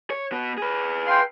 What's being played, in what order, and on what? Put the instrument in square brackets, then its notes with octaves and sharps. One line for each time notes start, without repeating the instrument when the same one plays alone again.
[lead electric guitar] C#5
B3 F#4
G#4 B4
[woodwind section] F5 G5 C6